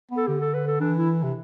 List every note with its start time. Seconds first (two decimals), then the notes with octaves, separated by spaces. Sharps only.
0.11 B3
0.17 A4
0.28 D3 G4
0.41 A4
0.54 B4
0.67 A4
0.80 E3 D4
0.98 E4
1.23 C3